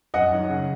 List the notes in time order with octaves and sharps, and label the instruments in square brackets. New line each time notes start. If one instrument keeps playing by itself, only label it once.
[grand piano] F#2 [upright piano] D#5 F#5
[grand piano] D#3 F#3 C#4 F#4
C#3